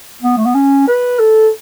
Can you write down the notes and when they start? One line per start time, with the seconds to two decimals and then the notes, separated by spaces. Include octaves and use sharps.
0.22 B3
0.37 A3
0.46 B3
0.55 C#4
0.88 B4
1.20 A4